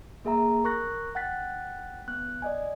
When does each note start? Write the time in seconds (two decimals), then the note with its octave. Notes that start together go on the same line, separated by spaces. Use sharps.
0.25 A#3 G#4 E5 A#5
0.64 A#4 C#6 F#6 A#6
1.15 F#5 G5 F#6 A6 B6
2.08 B3 F#6
2.42 D5 D#5 G#5